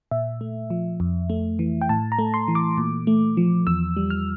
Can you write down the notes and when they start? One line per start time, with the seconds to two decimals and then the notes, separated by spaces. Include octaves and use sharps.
0.11 A#2 E5
0.41 A3
0.70 F3
1.00 F2
1.30 A3
1.59 E3
1.81 G5
1.89 A2 A5
2.12 A#5
2.19 A3
2.34 C6
2.48 E3
2.55 D6
2.78 A#2
3.07 A3
3.37 F3
3.67 E2 E6
3.97 G3
4.10 F6